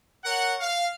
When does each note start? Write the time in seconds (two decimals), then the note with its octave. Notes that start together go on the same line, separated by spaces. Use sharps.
0.24 A#4 C#5 F#5
0.60 F5